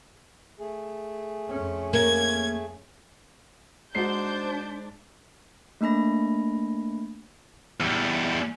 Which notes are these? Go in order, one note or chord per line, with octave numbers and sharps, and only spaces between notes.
A3 G#4
F2 C#4
A#3 G#6
G#2 D4 F#4 C5 G6 C7
A3 A#3 D4 B5 A#6
E2 G3